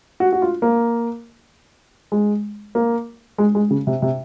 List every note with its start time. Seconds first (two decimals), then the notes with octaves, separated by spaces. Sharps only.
0.20 F#4
0.32 F#4
0.42 F4
0.62 A#3
2.12 G#3
2.75 A#3
3.38 G#3
3.55 G#3
3.71 C#3
3.87 C3
4.02 C3